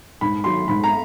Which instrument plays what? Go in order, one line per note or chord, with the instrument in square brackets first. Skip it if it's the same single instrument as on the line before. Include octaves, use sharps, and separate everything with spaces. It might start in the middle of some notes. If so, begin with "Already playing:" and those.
[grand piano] G#2 [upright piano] B5
[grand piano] D#3 F#3 [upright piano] C6
[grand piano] G#2 [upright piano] B5
[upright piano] A#5